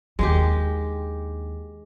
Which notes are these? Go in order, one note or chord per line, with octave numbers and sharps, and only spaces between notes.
D#2 G#3 D4 G4